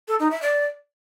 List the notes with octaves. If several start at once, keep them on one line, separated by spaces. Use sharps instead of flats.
A4
D#4
E5
D5